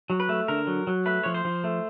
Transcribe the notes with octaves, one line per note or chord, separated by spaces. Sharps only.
F#3
B4
A3
D3 A#4
F#3
F#3
A3 B4
F3 C#5
C5
F3
A3